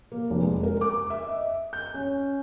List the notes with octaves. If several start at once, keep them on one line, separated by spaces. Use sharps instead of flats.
A#3
F1
G#3
A#4
D6
E5
D#5
G6
C#4